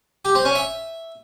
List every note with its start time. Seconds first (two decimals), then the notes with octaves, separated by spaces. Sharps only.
0.25 G4
0.35 C4
0.45 C#4
0.55 E5